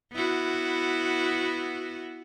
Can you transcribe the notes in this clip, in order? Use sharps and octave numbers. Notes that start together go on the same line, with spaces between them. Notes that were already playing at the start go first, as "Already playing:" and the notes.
B3 E4 F#4